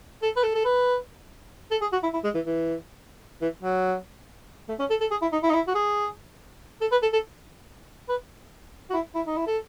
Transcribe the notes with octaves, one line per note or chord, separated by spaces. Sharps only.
A4
B4
A4
A4
B4
A4
G#4
F#4
E4
E4
G#3
E3
E3
E3
F#3
A3
C#4
A4
A4
G#4
E4
D#4
E4
D#4
E4
F#4
G#4
A4
B4
A4
A4
B4
F#4
E4
E4
D#4
E4
A4